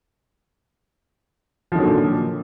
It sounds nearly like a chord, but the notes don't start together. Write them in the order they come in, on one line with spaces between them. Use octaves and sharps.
F3 D#3 F#3 D3 A#2